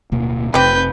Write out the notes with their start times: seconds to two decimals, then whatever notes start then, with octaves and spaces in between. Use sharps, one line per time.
0.12 D1 B2 A#3
0.54 F1 C3 C4 G4 B4 G6